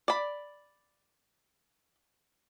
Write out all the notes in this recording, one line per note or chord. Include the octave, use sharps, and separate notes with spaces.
D5 B5